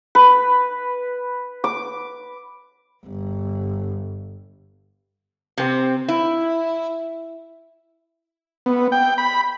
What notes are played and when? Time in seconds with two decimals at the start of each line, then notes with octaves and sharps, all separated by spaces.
0.15 B4
1.64 D6
3.05 G1
5.58 C3 C4
6.08 E4
8.66 B3
8.92 G5
9.18 B5